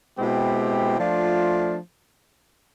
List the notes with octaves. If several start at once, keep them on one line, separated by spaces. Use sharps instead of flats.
B2 G#3 C4 E4 G4
F3 A3 D4 F4